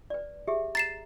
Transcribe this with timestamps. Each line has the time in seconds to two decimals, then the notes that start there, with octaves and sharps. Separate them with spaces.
0.10 B4 D5
0.47 G4 G#4 E5
0.75 A#5 A6 C7 E7